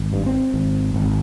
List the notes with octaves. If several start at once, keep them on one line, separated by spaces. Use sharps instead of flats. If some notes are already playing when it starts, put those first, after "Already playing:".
Already playing: G#1
G2
C4
G#1
G#1